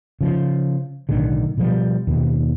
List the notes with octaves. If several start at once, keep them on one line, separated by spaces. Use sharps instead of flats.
C#3 F3
B1 A2 D3 D#3
B2 F3 G3
D#2 B2